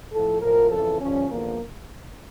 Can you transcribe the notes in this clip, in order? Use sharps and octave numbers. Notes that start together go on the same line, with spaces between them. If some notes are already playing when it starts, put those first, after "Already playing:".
A2 F3 A4
A2 F3 A#4
F2 C#3 E3 A4
G2 D3 F3 C#4
E2 D3 F3 A#3